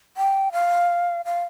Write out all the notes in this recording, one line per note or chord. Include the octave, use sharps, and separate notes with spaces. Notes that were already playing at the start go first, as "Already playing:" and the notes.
G5
F5
F5